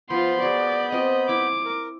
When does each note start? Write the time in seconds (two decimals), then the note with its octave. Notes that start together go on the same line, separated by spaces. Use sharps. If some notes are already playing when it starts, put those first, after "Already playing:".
0.10 F3 B3 F4 B5 C6 G6
0.42 F#4 G#4 D5
0.92 C4 F4 D5 D#5
1.29 E4 D6
1.65 A#4